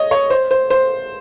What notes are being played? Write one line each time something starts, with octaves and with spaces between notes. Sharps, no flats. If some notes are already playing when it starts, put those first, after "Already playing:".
Already playing: C#5 D#5
C#5
C5
C5
C5